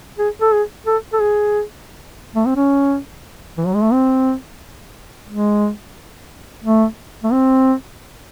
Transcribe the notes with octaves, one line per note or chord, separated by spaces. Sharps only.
G#4
A4
G#4
A4
A4
G#4
A3
C4
C#4
E3
F#3
G#3
A3
C4
G#3
A3
A3
C4